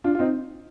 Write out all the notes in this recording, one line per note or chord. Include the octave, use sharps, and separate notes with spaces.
D4 F4
F4
C4 D#4